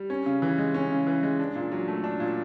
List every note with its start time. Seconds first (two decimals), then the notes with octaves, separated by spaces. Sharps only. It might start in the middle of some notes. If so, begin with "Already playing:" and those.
Already playing: G3
0.10 C#4
0.26 C#3
0.42 E3
0.58 G#3
0.74 C#4
0.91 C#3
1.07 E3
1.23 G#3
1.40 D4
1.55 A#2
1.72 F#3
1.88 A3
2.04 D4
2.20 A#2